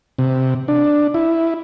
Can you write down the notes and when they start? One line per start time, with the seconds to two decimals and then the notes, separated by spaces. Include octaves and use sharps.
0.19 C3
0.68 D4
1.14 E4